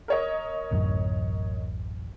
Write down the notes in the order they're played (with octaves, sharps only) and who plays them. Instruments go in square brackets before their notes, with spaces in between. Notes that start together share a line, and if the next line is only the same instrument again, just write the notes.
[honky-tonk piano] A#4 C#5 D#5
[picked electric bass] D1 A1 F#2